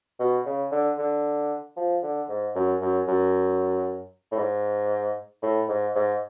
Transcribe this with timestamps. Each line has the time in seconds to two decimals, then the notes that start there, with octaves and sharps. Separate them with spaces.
0.20 B2
0.46 C#3
0.72 D3
0.99 D3
1.77 F3
2.03 D3
2.29 G#2
2.55 F#2
2.81 F#2
3.08 F#2
4.32 A2
4.38 G#2
5.43 A2
5.69 G#2
5.96 G#2